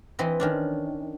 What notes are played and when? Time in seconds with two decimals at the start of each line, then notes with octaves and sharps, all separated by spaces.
0.19 E3 C4 B4 D#5
0.40 D#3 C#4 D4